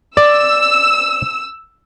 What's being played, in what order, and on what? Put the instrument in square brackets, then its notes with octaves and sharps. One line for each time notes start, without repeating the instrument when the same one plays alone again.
[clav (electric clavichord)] D5 [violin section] E6